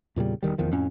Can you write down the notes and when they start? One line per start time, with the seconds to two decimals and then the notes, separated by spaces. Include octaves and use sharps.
0.16 E2 A#2 C#3 G3
0.43 E1 E2 D#3 G3
0.58 F1 E2 D#3 F3
0.71 F2 A2 C#4